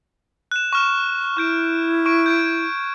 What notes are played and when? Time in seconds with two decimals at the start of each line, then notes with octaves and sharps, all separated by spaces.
0.51 F#6 E7
0.73 C#6 F6 E7
1.37 E4 C#6 G6 D7
2.06 C#6 D7
2.26 G6 G#6 D7